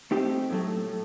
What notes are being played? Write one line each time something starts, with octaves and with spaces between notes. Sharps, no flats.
A3 C4 D#4 G4 C5
A2 F#3 A3
A2